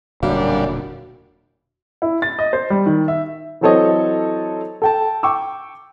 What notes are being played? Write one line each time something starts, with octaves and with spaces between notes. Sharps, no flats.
E1 F#2 A#2 D3 G3 D4 F#4 F5
E4
A6
D#5
C5
G3
D#3
E5
E3 F#3 C4 A4 C#5 D#5
A4 G5 A5
G5 C#6 D6 E6